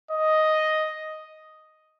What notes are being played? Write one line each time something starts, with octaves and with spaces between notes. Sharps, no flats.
D#5